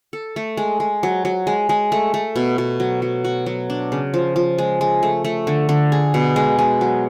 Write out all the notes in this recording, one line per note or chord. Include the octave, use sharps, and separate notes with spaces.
A4
A3
G#3
G#3
F#3
F#3
G#3
G#3
A3
A3
B2
B2
F#3
F#3
F#4
F#3
D4
C#3
F3
F3
G#3
G#3
A3
A3
D3
D3
G#4
B2
G#3
G#3
F#3